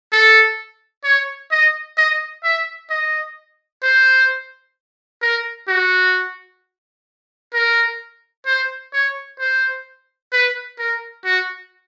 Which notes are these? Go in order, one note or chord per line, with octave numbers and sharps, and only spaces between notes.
A4
C#5
D#5
D#5
E5
D#5
C5
A#4
F#4
A#4
C5
C#5
C5
B4
A#4
F#4